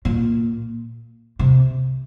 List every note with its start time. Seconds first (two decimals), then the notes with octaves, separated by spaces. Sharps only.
0.05 A#2
1.39 C3